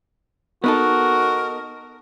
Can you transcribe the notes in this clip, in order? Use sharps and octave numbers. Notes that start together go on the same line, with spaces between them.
B3 D#4 F#4 A4 A#4